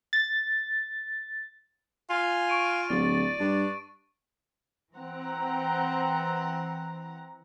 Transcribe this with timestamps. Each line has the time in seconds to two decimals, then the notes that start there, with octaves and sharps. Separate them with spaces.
0.13 A6
2.10 F4 F5 G#5
2.49 C#6 D7 D#7
2.90 D1 D5 A6
3.40 G2 D4
4.94 E3 C4 F#5 A#5